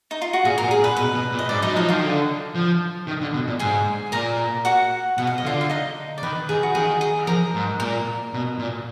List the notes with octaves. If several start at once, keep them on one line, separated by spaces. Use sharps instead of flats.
D#4
F4
F#4
A#2 G#4
A#2 A#4
G#4
A#2
B4
B2 B4
B2
A#2
D#5
G#2 D5
F#3 D#4 D#5
F3 D#4 D#5
D#3 F4 F5
D3
F3
D#3
D3
B2
A#2
G#2 G#4 G#5
A#2 A#4 A#5
F#4 F#5
B2 F#5
F5
D#5
D3 F4 F5
F5
D#4 D#5
D5
D#3 B4
D#3 G#4
F#4
D#3 G#4
G#4
F3 A#4
G#2
A#2 A#4
B2
A#2